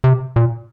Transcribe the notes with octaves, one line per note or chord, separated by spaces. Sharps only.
C3
A#2